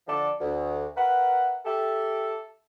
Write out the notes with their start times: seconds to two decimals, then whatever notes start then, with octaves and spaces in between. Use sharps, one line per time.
0.07 D3 F3 D4 A4 D5
0.40 D2
0.96 A#4 B4 E5 F#5
1.65 G4 A4 E5